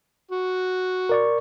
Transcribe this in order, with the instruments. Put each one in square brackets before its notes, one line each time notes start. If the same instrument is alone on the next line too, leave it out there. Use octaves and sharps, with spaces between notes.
[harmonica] F#4
[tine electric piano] A#4 D5 C#6